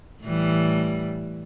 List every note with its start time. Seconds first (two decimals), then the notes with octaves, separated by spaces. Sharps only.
0.23 A2 E3 G3